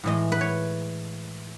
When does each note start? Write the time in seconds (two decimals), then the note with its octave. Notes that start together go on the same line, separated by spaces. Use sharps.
0.04 A2 E3 G#3 D#5
0.32 B4
0.41 C#5